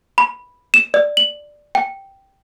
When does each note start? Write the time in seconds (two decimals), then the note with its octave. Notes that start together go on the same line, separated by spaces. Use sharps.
0.18 B5
0.74 E7
0.94 D5
1.17 F#7
1.75 G5